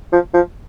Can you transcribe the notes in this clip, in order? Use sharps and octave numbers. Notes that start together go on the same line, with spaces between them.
F3
F3